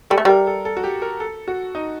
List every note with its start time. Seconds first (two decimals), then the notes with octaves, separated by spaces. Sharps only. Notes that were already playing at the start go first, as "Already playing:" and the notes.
0.10 G3 A4
0.18 A3
0.25 G3 A#4
0.47 A4
0.65 A4
0.77 F#4
0.84 G4
1.02 A#4
1.20 A4
1.48 F#4
1.75 D#4